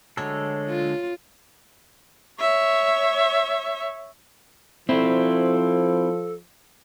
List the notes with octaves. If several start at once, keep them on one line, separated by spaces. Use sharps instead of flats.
D3 F#3 G#3 A3 A4 C#5
F4
C#5 E5
F3 C4 E4 A4